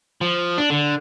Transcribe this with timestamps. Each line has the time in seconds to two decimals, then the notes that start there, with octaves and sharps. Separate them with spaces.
0.21 F3
0.58 D4
0.70 D3